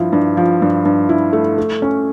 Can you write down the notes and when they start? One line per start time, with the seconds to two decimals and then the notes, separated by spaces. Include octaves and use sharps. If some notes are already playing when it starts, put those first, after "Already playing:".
Already playing: G2 F3 E4
0.13 G2
0.37 F3
0.62 G2
0.85 G2
1.09 E4
1.33 A3
1.58 A3
1.82 C#4